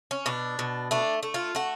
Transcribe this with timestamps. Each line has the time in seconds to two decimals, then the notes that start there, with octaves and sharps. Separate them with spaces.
0.11 C#4
0.26 B2 D4
0.59 B2
0.91 A3 D4
1.23 A3
1.34 F4
1.55 A3 F#4